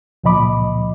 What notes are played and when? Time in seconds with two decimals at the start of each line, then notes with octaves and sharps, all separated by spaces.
0.24 C#2 A#2 F3 D#5 B5 D6